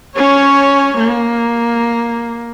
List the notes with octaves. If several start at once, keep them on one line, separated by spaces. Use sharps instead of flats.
C#4 C#5
A#3